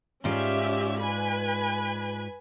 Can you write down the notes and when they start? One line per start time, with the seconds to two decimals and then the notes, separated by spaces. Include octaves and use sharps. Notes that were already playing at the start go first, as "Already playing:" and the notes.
0.24 G#2 C#4 F4 G4 D5 E5
1.01 B4 G#5 B5